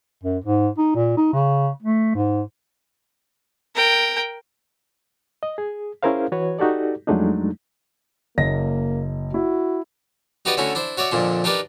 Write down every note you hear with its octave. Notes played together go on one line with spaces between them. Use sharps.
F#2
G#2
D#4
A#2
D#4
C#3
A3
G#2
A#4 G5
D#5
G#4
C#4 E4 G#4 A#4 C5 F5
E3 F#4 B4 C#5
D#4 F#4 G4 A4 D5
F2 F#3 G#3 A3 D4 D#4
F#1 A#3 D#5 A#6
E4 F#4
D#4 F#4 G4 B4 D5 D#5
D3 A3 C#4 E4 F#4
D4 E4 C5
F#4 C#5 D5 E5
F2 A#2 D3 D4
D4 D#4 G4 A#4 B4 D5